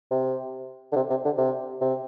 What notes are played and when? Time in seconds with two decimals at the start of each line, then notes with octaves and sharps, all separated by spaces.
0.11 C3
0.92 D3
0.96 C3
1.10 C3
1.25 D3
1.38 C3
1.81 C3